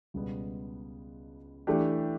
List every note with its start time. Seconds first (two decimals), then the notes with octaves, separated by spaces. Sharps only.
0.14 C#2 B2 G3 B3
1.67 E3 A3 D4 G4